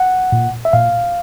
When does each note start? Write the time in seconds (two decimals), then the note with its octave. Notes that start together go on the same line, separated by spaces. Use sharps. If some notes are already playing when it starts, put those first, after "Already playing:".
Already playing: F#5
0.32 A#2
0.65 E5
0.73 A#2 F5